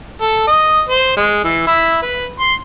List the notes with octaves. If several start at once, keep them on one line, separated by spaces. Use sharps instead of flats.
A4
D#5
C5
G#3
E3
E4
B4
C6